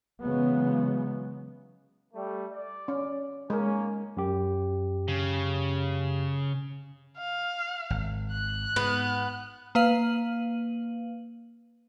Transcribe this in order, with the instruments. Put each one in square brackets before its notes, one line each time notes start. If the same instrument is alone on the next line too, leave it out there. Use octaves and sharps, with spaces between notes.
[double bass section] C#3 E3 F#3 G#3 B3
[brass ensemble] G3 A3
D5
[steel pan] C#4
[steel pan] G#3 A#4 [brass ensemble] A#3 C#4
[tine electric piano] F#2 G4
[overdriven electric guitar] C#3
[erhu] F5
[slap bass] G#1
[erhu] F#6
[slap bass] G#2 [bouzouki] B3
[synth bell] A#3 B4 F5 D#7 F#7